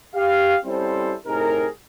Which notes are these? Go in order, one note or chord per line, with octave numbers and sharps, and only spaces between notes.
G4 F5
G3 C4 C#4 E4 A4 C5
A2 C3 D#4 G4 G#4 A#4